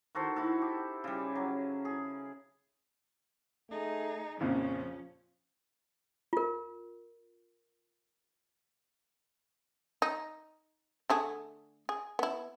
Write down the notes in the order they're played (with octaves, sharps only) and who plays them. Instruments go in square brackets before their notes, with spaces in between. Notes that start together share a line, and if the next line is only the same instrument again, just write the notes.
[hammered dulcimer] D#3 F#4 A4 C5
E4 F#4 A4
G4
C#3 G3
F#3
G#4
[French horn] A3 [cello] D#4 G#4
[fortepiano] A#1 F2 C#3 [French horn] F3 [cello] C#4
[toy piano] F4 A#4
[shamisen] D#4
D3 A3 G#4
G#4
B3 E4